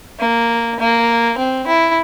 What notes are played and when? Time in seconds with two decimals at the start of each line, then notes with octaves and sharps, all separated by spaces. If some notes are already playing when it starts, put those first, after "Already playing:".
0.20 A#3
0.79 A#3
1.38 C4
1.67 E4